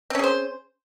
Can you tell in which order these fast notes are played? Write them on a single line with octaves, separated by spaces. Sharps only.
C4 C#4 G#4 C5